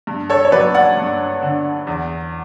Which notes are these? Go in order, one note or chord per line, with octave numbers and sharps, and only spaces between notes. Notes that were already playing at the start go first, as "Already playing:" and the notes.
G2
A4 C#5
C#5
F#3 B4 D5
D5 F#5
G2
D3
E2